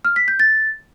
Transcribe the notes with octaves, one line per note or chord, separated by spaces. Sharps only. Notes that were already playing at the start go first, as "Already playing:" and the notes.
F6
B6
G6
A6